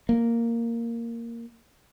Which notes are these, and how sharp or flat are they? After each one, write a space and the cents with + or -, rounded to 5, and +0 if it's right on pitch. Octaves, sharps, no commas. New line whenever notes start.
A#3 -5